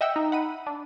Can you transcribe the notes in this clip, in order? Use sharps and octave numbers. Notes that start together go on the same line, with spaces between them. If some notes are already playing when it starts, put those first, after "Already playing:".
D#5 E5 F#5 G5 E6
D#4
F#5 B5 D#7
D4